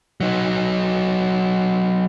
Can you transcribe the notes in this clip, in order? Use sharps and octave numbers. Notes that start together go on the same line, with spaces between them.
F#3 D#4